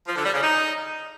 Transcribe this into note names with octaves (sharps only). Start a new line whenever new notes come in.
F3
D3
G3
C#3
D#4